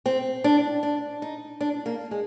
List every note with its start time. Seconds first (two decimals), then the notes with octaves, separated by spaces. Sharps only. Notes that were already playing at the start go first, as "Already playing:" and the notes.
0.06 C4
0.44 D4
0.83 D4
1.22 D#4
1.61 D4
1.86 A#3
2.11 G#3